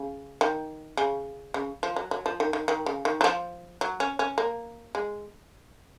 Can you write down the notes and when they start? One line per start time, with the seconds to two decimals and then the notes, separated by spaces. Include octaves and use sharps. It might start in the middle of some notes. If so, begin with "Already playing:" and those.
Already playing: C#3
0.41 D#3
0.97 C#3
1.54 C#3
1.83 F3
1.96 F#3
2.11 F#3
2.26 F3
2.40 D#3
2.53 D#3
2.68 D#3
2.86 C#3
3.05 D#3
3.21 F#3
3.24 F3
3.81 F#3
4.00 C#4
4.19 C#4
4.38 A#3
4.95 G#3